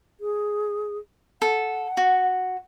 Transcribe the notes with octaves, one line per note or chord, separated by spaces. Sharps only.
G#4
A4 F#5
F#4